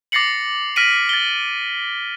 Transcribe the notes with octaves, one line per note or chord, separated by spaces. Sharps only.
D6 A6 A#6 C7 C#7 F#7
F6 A#6 B6 D7 D#7 F#7
A6 G7